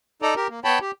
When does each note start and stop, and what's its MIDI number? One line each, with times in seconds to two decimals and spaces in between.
0.22 0.34 63
0.22 0.34 69
0.22 0.34 74
0.22 0.34 82
0.36 0.48 67
0.36 0.48 70
0.49 0.60 58
0.64 0.79 59
0.64 0.79 73
0.64 0.79 79
0.64 0.79 81
0.64 0.79 83
0.81 0.91 67